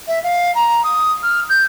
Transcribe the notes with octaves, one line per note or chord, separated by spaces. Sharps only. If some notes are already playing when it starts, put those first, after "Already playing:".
E5
F5
A#5
D#6
F6
G6